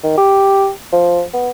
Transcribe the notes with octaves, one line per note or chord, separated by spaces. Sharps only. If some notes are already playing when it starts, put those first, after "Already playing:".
D#3
G4
F3
B3